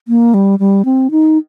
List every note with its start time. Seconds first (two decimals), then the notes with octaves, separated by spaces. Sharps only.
0.08 A#3
0.34 G3
0.59 G3
0.85 C4
1.11 D#4